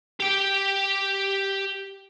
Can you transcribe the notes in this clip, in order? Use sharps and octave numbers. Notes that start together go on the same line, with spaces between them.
G4 G5